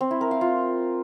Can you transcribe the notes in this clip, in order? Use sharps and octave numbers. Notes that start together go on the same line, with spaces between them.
C4
E4
A#4
F5
F4